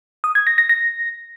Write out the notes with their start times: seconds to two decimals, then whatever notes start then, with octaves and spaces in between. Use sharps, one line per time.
0.24 D#6
0.35 G#6
0.47 A#6
0.58 A#6
0.69 A#6